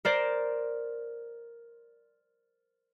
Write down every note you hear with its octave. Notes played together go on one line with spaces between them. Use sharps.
A#4 C5 D5